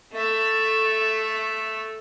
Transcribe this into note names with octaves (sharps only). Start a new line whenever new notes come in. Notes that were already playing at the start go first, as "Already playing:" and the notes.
A3 E5